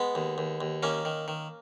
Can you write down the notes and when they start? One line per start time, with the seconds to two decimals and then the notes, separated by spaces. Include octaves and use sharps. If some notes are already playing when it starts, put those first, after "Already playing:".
Already playing: G#3 B3
0.15 D#2
0.38 D#2
0.61 D#2
0.83 D#3 A#3 C#4
1.05 D#3
1.28 D#3